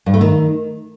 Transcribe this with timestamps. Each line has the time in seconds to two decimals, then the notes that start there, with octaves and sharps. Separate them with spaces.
0.06 G2
0.14 A3
0.21 D#3